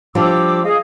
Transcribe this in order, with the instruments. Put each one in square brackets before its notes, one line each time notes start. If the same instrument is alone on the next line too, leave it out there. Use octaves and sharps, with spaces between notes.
[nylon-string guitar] F3 G3 D4 [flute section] D6 E6
[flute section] G#4 D#5 F5